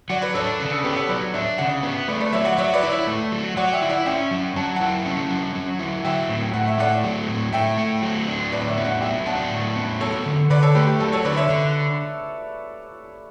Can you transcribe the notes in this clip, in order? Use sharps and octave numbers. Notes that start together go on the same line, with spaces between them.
F#3 D5 F#5
B4 D5
D4 A4 C#5
A4
C#3
A4
B3 G4 B4
A4 C#5
F#3 B4 D5
D4 C#5 E5
C#3 D5 F#5
B3
A3 B4 D5
B4 D5
F#3 C#5 E5
D5 F#5
F#3 C#5 E5
B4 D5
E4
C#5 E5
A3
F#3
F#3 D5 F#5
E5 G5
E4
D5 F#5
C#4 E5 G5
F#3
F#3 A5
E4 F#5 A5
C#4
F#3
F#3
E4
F#3 E5 G5
A2
A2 F#5
E5
A3 D5 F#5
F#3
A2
A2 E5 G5
A3
F#3
D4
A2 B4 D5
C#5 E5
B3
D5 F#5
F#3 E5 G5
D4 F#5 A5
A2
B3
F#3 A4 C#5
D3
D3 B4 D5
A4 C#5
A3 G4 B4
G4
F#3 A4
A4 C#5
D3 B4 D5
C#5 E5
D3